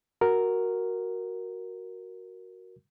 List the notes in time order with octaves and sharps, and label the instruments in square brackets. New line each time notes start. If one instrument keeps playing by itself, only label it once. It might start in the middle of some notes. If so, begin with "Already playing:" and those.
[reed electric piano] F#4 A#4